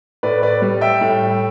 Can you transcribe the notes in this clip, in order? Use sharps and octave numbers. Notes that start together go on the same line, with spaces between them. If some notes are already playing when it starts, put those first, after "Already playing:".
A2 B4 D5
B4 D5
G3
E5 G5
A2